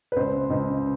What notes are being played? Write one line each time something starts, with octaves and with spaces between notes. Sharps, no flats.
B4
C#2 C5
C#2